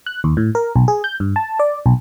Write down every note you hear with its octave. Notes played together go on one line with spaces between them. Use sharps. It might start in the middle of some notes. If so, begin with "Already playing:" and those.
F#6
D#2
A2
A#4
B1
G#4
G6
G2
A5
D5
B1